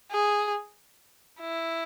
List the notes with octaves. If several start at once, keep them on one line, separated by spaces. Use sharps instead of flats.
G#4
E4